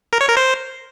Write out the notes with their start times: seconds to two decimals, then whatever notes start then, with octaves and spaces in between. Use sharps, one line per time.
0.13 A#4
0.21 C#5
0.29 A#4
0.37 C5